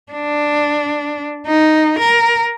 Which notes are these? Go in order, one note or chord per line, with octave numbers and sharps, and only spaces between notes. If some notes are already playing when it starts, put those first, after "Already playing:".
D4
D#4
A#4